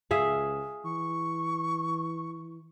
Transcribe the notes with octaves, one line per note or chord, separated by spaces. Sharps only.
C#2 G#4 E5 F5
E3 C#6